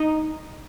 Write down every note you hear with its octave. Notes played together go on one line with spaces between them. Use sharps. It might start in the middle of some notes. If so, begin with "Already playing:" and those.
Already playing: D#4